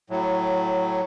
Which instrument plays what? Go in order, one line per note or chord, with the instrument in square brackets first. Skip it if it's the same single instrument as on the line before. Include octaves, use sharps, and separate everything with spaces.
[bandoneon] A2 F#3